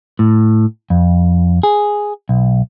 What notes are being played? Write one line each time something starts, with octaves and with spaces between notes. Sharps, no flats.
A2
F2
G#4
B1